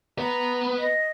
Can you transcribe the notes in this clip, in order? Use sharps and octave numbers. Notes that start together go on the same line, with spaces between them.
B3 B4 A#5
D#5